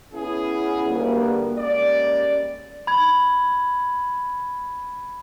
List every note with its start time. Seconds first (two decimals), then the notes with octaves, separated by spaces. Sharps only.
0.14 B3 C#4 E4 G#4
0.87 D2 G3 A#3 B3
1.57 G3 G#3 A#3 C#4 D5
2.87 B5 G#6